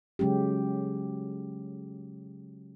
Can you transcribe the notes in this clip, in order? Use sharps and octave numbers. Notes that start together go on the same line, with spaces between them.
C#3 F#3 G#3 C#4 G4